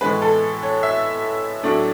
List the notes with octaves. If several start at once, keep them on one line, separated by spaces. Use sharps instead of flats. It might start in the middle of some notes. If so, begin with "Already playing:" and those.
A2 E3 G#3 B4
A4
C#5
E5
A2 F#3 A3 D4